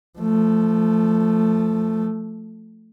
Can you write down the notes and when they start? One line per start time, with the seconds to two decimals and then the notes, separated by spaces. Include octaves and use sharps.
0.19 F3 A3